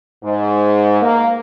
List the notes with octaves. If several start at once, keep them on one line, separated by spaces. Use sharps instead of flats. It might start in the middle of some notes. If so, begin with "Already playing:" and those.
G#2
A#3